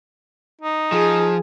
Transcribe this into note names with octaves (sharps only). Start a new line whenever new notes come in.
D#4
F3 G#4